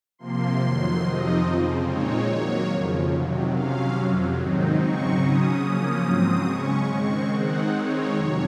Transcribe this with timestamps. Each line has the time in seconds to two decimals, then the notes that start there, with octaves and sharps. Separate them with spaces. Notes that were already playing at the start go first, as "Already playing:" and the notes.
0.19 C3 F3 A#3 C6
0.60 F2 D#3 F#3
1.02 F2 C3 F3 C4 D#4 D#5
1.44 F2 C#3 F3 C4
1.85 A#2 G#3 C4 D#4 C#5
2.28 D#3 F#3 A#3
2.70 F2 C#3 F3
3.11 C3 D#3 F#3
3.53 C3 F#3 C#4 F5
3.95 F2 C3 F#3
4.37 G#2 D#3 F#3 C4 D#4
4.78 C#3 F#3 C4 D#4 C#6
5.21 C#3 F#3 C#4 D#6
5.62 C#3 F3 A#3 C#4
6.04 G#2 F#3 C4 D#6
6.46 C#3 G#3 C#4 C#6
6.88 D#3 G#3 C4 C#6
7.30 D#3 G#3 C4 D#4 F#5
7.71 D#3 G#3 C4 D#4 C#5
8.13 F2 C3 F#3 C#5